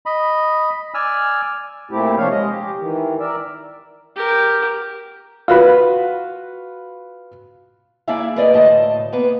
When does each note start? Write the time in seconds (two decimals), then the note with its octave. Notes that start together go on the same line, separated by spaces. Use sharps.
0.06 D#5 B5
0.94 D5 G#5 E6 F6
1.91 A#2 A3 C4 E4 G4
2.17 C3 F3 D4 C#5 F5
2.31 G#3 D#5
2.49 G4
2.80 D#3 E3
3.20 A#4 D5 E5
4.16 G4 A#4
5.48 F4 F#4 B4
8.07 A#3 D4 E4 G#4 E5 F5
8.36 A#3 G#4 A#4 B4 D5 D#5
8.54 D2 A2 D#5 A5
9.12 A#3 B3 B4